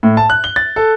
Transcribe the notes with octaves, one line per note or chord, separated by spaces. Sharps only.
A2
A5
F#6
G7
A6
A4